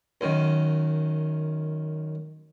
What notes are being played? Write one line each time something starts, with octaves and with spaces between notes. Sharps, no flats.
F#2 D#3